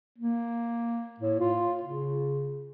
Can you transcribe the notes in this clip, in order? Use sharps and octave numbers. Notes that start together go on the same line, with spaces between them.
A#3
A2
F4
C#3